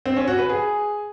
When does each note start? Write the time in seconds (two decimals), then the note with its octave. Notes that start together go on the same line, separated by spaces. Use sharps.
0.06 C4
0.17 C#4
0.28 F#4
0.38 B4
0.49 G#4